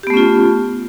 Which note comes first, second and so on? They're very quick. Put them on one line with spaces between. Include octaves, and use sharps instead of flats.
G4 B3 A3 C#4 F4